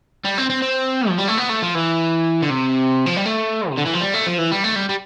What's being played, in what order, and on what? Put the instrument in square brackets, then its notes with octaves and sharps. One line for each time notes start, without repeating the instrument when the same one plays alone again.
[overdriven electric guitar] G3
C4
C4
C4
F3
G3
A3
B3
A3
F3
E3
D3
C3
F3
G3
A3
C3
D3
E3
F3
G3
A3
F3
E3
G3
A3
G3
G3